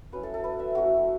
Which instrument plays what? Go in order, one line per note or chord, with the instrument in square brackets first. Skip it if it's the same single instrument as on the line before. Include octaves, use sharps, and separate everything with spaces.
[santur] F#3 C#4 E4 B4
A4
A4
B4
E5
F#3 A3 C#4 E4 F#4